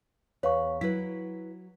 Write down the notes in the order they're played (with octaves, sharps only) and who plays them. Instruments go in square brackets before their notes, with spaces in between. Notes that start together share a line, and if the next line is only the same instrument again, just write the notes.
[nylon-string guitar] E2 B4 [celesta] C#5 F5 C#6
[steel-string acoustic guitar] F#3 [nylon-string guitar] E4 B4 [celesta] B6